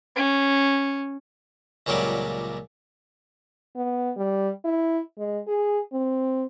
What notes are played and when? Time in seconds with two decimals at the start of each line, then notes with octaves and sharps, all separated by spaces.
0.16 C#4
1.86 C#2 A#2 F#3 G3 D4 D6
3.76 B3
4.16 G3
4.65 E4
5.18 G#3
5.48 G#4
5.93 C4